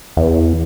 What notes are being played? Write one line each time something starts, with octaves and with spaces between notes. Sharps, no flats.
E2